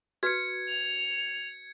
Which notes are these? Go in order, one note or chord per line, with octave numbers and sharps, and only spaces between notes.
F#4 B4 G#6 C#7
F7